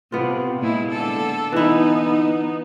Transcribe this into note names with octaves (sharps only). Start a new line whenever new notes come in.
C3 B3 F4
A#2 G#3 E4
D3 A4
E3 B3 D#4 E4